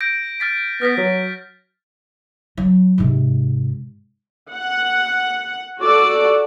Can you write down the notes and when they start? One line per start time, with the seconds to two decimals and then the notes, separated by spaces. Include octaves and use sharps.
0.01 G6 A#6 D7
0.40 F6 A6 B6
0.82 B3 F6 A#6 B6
0.97 F#3 B6
2.57 F#3
2.98 G#2 C3
4.54 F#5
5.81 F#4 A4 D5